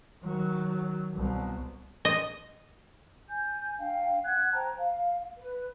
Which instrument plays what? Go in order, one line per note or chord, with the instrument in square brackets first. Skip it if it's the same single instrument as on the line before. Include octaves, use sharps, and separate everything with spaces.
[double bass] D#3 F#3
C2 B2
[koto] D#5
[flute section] G#5 G6
D4 F5 G5
F#5 F#6 G#6
C5 G5 A5 A#5
F5
B4